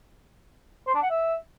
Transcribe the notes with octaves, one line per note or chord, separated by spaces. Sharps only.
C5
D4
F#5
E5